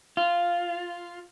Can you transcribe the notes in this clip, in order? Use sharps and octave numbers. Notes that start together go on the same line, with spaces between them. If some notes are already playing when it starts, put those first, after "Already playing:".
F4